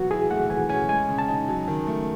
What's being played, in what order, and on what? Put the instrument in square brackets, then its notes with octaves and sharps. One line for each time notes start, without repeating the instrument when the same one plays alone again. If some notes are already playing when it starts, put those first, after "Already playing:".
Already playing: [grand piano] F#3 B3 [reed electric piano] F#4
[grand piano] E4 [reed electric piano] G#4
[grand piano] A3 [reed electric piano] F#5
[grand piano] E3 [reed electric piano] G#5
[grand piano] C#4 [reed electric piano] G#5
[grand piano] G#3 [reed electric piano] G#5
[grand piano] C#3
[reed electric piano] A5
[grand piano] D#4
F#3
D#3
A3